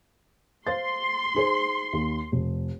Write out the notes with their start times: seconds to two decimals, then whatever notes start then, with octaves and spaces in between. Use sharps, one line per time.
0.67 C5 F5 C6 A6
1.35 D#4 G#4 C5
1.93 D#2
2.32 F1